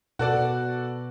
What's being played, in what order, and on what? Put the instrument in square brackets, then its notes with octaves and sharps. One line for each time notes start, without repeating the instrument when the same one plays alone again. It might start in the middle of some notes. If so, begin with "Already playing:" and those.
[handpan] B2 B4 [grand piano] F#4 A4 D5